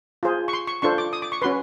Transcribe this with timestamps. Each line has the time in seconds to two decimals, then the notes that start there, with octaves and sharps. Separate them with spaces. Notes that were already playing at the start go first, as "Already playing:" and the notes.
0.23 F4 G#4 C5
0.48 C#6
0.53 C6
0.67 C#6
0.82 D4 F4 A4 C5 C#6
0.98 D6
1.13 D#6
1.22 D6
1.32 C#6
1.42 C#4 F#4 B4 C6